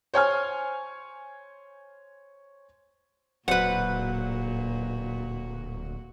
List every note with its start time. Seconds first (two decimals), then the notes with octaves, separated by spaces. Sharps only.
0.14 C5 C#5 G#5 F6
3.48 D1 A#2 F#3 F#4 B4 C5 D5 F#5